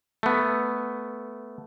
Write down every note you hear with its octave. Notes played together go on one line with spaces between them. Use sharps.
A3 B3